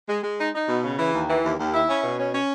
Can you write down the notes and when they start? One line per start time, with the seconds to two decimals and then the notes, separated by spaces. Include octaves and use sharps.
0.09 G#3
0.24 G#3
0.39 D#4
0.54 D#4
0.68 B2
0.83 C#3
0.98 E3
1.13 D#2
1.29 E3
1.43 D#2
1.59 D#2
1.73 E4
1.88 C#4
2.04 B2
2.18 C#4
2.33 C#4